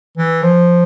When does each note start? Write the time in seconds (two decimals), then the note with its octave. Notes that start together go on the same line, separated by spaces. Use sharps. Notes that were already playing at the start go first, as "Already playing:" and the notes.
0.18 E3
0.43 F3